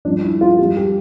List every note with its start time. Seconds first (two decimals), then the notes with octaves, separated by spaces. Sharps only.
0.05 F3 D4
0.08 G2
0.23 E4
0.41 F4
0.58 G2 F3 G4
0.77 G4